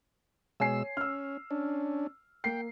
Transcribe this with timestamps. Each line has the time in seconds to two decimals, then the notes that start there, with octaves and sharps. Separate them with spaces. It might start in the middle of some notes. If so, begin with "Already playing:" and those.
0.60 B2 G#3 C#5 G#5 E6 C7
0.97 C#4 E6 F6
1.51 C#4 D4
2.44 A#3 G5 C7